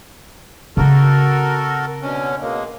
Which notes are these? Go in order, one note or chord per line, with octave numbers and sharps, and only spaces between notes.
C#3 C4 F#4 A4 A#4
B2 D3 C#4
B2 G#3 A#3